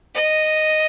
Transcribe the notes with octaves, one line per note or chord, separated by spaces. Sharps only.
D#5